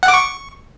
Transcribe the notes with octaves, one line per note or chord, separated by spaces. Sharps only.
F#5
D6
C#6